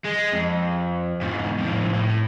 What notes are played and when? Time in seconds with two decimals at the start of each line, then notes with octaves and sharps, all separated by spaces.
0.05 G#3
0.33 F2
1.22 E2 G#2
1.60 F2 A2
1.94 A2